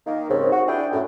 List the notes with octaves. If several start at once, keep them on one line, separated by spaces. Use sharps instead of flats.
D#3 A#3
D#2 G#2 C#3 C4
F#4
D4 E4 G#4 G5
F#2 A2